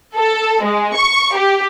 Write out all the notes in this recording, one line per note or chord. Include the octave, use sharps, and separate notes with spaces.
A4
G#3
C#6
G4